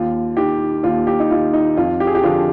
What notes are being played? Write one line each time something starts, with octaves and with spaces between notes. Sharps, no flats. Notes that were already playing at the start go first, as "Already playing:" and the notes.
Already playing: D#2 F4
D#3 G4
D#2 F4
G4
D#4
D#3 F4
D#4
F2 F4
G4
G#4
G4
D3 F3 F4